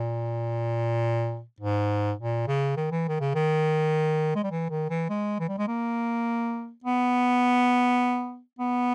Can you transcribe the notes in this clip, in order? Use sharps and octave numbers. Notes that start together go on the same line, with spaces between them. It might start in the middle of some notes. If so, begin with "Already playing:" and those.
Already playing: A#2
G#2
A#2
C#3
D#3
E3
D#3
C#3
D#3
G#3
G3
E3
D#3
E3
G#3
E3
G3
G#3
A#3
B3
B3